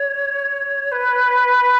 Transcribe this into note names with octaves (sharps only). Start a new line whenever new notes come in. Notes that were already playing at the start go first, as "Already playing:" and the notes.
Already playing: C#5
B4